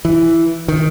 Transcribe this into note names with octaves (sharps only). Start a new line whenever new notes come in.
E3
D#3